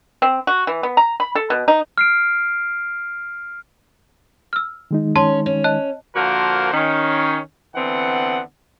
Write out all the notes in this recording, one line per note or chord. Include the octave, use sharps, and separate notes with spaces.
C4
F#4
E3
B3
A#5
B5
A4
B2
D#4
F6 C7 D7
E6 F6
D#3 G#3 D#4
C#4 A5 C6
C#4
D#5 A5 F#6
D3 F3 A#3 F#4 A#4 C5
D#3 C#4
D3 E3 B3 C4 F#5